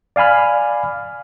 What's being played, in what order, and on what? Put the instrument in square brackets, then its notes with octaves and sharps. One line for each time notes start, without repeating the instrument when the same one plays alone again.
[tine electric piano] D5 F5 G#5 B5 F6